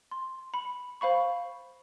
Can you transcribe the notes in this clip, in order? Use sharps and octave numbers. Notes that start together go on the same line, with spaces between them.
C6
B5
C5 F5 B5 C#6